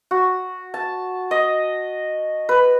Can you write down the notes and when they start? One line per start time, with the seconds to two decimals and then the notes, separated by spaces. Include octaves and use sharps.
0.11 F#4
0.74 A5
1.31 D#5
2.49 B4